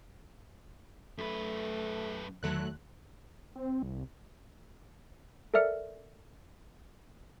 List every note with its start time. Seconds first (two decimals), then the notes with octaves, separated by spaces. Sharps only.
1.18 F#2 A3 B4
2.43 E2 D3 D#3 F#3 A3 F#6
3.55 C4
3.83 C2
5.54 A4 A#4 D5 E5 F6 C#7